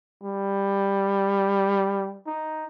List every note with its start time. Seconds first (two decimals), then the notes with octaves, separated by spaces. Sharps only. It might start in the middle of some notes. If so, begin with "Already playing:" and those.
0.23 G3
2.26 D#4